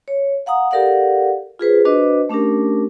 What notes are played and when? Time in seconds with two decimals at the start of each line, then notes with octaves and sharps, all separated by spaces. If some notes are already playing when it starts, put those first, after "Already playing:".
0.08 C#5
0.46 F5 F#5 A#5 D#6
0.71 G4 A4 A#4 D5 F5 F#5
1.59 F4 G#4 B4 C5
1.85 D4 F#4 B4 C5 D#5
2.29 A3 C#4 D4 G4 A#4